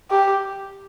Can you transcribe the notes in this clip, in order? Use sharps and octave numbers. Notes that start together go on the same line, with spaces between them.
G4